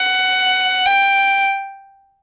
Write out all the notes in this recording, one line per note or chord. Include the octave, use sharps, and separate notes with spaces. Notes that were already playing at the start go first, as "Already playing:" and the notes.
Already playing: F#5
G5